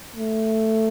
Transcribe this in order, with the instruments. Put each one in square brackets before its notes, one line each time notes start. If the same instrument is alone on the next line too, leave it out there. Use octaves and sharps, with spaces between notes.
[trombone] A3